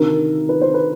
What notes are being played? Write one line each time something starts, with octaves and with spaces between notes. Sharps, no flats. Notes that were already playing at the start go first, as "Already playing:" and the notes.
Already playing: D2 C3 D#3 A#4
B4
C5
B4